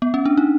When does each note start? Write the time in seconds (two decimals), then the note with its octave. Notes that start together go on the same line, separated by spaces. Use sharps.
0.02 B3
0.14 C#4
0.26 D4
0.37 D#4